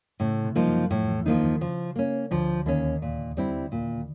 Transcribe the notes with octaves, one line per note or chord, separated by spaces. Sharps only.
A2 C#3
C3
F3 G3 A#3 D#4
F#2 F#3
F2 A2 F3
E2 E3
D#2 D#3 F3 A#3 D#4
D#2 D#3
C#3 F3
A#3 C#4
D2 D3 F3
D#2 D#3 A#3 C#4
A#2
G3 C4 E4
A#2